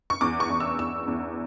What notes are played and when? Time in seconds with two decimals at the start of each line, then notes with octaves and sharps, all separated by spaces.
0.10 C#6
0.21 E2 D6
0.40 C#6
0.50 E2
0.60 E6
0.79 E2 E6
1.08 E2